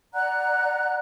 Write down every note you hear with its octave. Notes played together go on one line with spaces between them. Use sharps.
D5 F#5 A#5 F#6